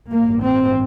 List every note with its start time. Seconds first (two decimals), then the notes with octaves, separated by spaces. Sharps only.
0.10 A1 G2 A#3
0.43 C4